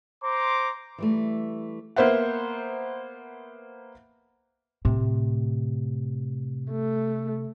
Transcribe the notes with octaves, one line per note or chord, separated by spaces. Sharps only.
C5 A#5 C6 D6
E3 G3 A3
A#3 B3 C5 E5 F#5
A2 C3
A3